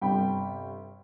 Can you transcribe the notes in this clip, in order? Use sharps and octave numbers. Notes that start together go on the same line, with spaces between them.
G1 C3 G3 G4 G5 B5